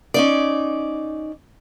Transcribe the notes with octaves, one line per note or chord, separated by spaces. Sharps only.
C#4 D#4 D5